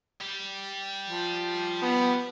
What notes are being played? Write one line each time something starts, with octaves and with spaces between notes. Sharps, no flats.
G3
F3
B3